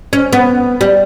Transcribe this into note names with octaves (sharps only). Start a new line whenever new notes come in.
C#4
B3
G3